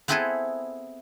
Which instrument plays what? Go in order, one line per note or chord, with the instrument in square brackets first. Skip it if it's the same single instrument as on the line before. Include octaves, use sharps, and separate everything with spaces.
[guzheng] B3 C4 E4 G#4 A4 B4